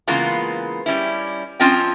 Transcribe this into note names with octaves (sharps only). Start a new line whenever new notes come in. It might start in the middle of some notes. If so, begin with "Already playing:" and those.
C#3 E3 G#3 A#3 B3 F4
G3 C#4 E4
F3 C4 C#4 F4 D#5 G5